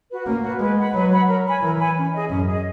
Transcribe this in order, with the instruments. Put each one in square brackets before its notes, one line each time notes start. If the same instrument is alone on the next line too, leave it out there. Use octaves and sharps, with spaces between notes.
[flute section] F#4 B4
[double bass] A#3 [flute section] C#4
[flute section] F#4 B4
[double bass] G#3 [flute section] B4
[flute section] F#5 B5
[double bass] F#3 [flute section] B4
[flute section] F#5 B5
A#4
C#5 G#5 B5
[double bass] E3 [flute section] A#4
[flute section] C#5 G#5 B5
C#4
G#4 D#5
[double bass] F#2 [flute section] C#4
[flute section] G#4 D#5